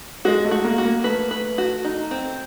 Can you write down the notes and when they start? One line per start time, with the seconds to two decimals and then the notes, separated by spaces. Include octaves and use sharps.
0.25 G#3 F#4
0.45 A3
0.51 F#4
0.64 A#3
0.78 F#4
0.85 A#3
1.04 A3 B4
1.31 B4
1.58 F#4
1.85 D#4
2.11 C4